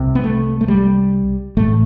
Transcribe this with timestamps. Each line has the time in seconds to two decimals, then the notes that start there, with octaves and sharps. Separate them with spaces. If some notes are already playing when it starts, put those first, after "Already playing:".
Already playing: C2 C3
0.15 B3
0.24 A3
0.61 A3
0.68 G3
1.57 A1 A2 A3